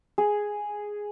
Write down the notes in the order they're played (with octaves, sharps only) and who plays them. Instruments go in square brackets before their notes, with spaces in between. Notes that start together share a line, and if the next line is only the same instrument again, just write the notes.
[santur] G#4